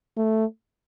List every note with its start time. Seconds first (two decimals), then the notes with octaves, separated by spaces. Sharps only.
0.17 A3